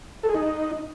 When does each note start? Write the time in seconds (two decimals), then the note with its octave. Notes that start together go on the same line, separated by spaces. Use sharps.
0.23 A4
0.29 G#4
0.35 D#4